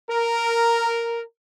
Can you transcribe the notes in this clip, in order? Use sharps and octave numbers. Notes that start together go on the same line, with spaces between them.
A#4